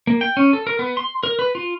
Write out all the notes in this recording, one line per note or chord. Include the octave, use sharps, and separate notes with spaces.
A#3
G5
C#4
A4
A#4
B3
C6
A#4
B4
F4